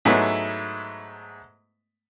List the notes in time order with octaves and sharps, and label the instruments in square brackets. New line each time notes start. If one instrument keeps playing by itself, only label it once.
[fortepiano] G#2 F#3 G#3 A3 B3 E4